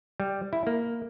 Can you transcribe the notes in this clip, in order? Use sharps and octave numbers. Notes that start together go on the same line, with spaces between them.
G3
E4
A#3